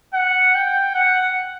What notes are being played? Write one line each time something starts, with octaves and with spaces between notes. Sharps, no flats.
F#5
G5
F#5